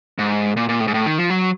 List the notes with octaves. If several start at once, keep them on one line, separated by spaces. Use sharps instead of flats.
G#2
A#2
A#2
A2
G#2
A2
D#3
F3
F#3